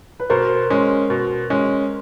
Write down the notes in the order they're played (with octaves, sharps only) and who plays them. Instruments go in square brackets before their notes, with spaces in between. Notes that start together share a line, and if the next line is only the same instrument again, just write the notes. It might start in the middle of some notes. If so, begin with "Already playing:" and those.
[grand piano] B4
[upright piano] B2 [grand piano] A#4 C5
[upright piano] G#3 C#4
B2
G#3 C#4